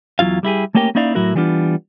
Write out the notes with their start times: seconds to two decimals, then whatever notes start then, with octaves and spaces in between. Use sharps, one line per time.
0.19 E2 F#3 E4 F4 F5
0.43 G3 E4 G4 G#4
0.75 A3 A#3 C#4 G4 A#4 G5
0.95 A#3 C#4 D#4 E4 D5 F5
1.15 A2 F#3 E4 F#4 A#4
1.35 E3 G3 B3 D4 F4